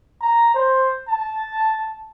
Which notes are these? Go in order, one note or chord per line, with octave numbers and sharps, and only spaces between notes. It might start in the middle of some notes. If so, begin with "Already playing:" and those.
A#5
C5
A5